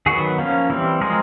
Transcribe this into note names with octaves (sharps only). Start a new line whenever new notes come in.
D#3 F#3 B3 F#4 G#4
F3 A#3 C#4
E3 G3 C4
F3 G#3 C4 G#4 A#4